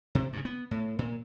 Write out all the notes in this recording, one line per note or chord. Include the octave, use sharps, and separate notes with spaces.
C3
G2 C#3
B3
A2
A#2